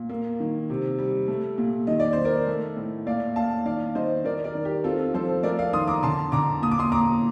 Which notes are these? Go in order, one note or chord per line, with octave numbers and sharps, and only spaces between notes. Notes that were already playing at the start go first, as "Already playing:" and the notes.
Already playing: A#2
A#3
D#3
C3
G3
A3
A#2
D#3 D#5
D5
D#3 C5
A#4 D5
A3
A2
A#2 D5 F5
A#2 F5 A5
D#3 D5 F5
D#3 C5 D#5
D#3 A#4 D5
A#4 D5
D#3
G4
C4 F4 A4
F3 A4 C5
A3 A#4 D5
D5 F5
D#3 C6 D#6
A#5 D6
D3 A5 C6
D3 A#5 D6
A#2 D#6
D6
C6 D#6
A#2 A#5 D6